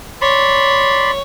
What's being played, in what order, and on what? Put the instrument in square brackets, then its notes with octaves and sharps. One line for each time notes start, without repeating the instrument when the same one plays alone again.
[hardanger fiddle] C#5 [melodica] D5 B5 C6